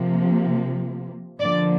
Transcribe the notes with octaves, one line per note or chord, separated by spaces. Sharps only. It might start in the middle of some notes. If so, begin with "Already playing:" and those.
Already playing: C3 F3 A#3
D3 F3 A#3 D5